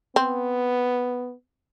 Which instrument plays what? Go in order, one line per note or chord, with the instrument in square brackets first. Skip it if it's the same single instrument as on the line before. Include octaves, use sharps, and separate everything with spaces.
[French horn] B3 [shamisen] C4